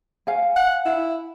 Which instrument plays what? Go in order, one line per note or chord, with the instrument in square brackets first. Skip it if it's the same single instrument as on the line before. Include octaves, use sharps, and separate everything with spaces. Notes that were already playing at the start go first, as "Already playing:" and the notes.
[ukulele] F5 G#5
[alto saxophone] F#5
E4